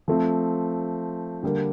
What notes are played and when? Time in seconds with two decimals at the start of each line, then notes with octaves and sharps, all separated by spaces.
0.08 F3 A3 C4
1.43 D3 G3 A#3